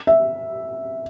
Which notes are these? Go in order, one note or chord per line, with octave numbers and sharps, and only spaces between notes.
E5